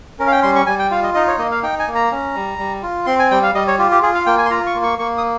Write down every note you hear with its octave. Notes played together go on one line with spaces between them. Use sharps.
C#4 A#4
F5
G5
G3 C6
C#6
G3 G#5
G5
F4 F5
D#5
D#4 D#5
C#5
A#3 D#5
F5
D#4 G5
G#5
A#3
A#5
C#4
G3
G3
F4
C4 C6
G#5
G3 G5
F5
G3 D#5
C#5
F4 G4
G4
F4 G#4
F5
A#3 G5
G#5
C6
F4 A#5
C#6
A#3
C#6
A#3 C#6
D#6